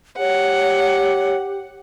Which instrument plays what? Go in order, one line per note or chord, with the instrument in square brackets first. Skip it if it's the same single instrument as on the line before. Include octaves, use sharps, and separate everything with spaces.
[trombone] G4 [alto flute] C#5 [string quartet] F#5